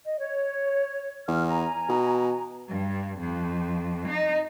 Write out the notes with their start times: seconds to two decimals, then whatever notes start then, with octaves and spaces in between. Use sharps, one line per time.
0.06 D#5
0.19 C#5
1.28 E2 F6
1.46 G#5 A#5
1.89 B2
2.69 G2
3.19 F2
4.08 D#4